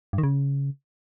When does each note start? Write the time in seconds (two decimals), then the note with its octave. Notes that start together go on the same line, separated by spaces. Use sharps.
0.13 G2
0.18 D#3
0.23 C#3